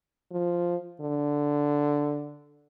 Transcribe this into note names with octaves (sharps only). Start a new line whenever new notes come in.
F3
D3